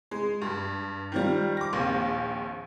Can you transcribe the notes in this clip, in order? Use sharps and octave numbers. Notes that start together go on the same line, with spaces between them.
G#3
G2
D#3 F3 G3
D6 A#6
A#1 D#2 C4